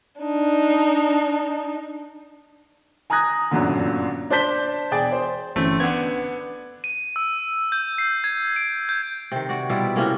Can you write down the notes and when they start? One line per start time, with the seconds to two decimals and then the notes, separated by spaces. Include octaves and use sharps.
0.21 D4 D#4
3.10 G#5 A#5 D#6 F#6 G#6 A#6
3.51 G1 F#2 A#2 D3
4.30 D4 C5 A5 G6 B6 G7
4.91 E1 G#4 D5 G5 A6
5.12 C5
5.56 G1 E3 A3 C4 C#4
5.80 D3 B3 G#6
6.84 D#7
7.16 E6
7.72 G6
7.98 C7
8.24 G#6
8.56 D7
8.89 G6
9.32 C3 D#3
9.49 F#4 D5
9.70 B2 G3 E4 F4
9.96 A2 C3 A#3 C#4